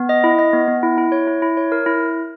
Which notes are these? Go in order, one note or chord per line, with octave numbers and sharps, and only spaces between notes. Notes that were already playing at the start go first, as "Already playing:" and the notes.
Already playing: B3
D#5
E4
D#5
B3
B3
E4
E4
C#5
E4
E4
C#5
A#4
E4